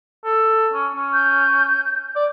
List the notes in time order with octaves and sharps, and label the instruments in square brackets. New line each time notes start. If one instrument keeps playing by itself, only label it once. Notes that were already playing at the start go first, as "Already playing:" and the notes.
[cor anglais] A4
C#4
C#4
[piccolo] G6
[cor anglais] D5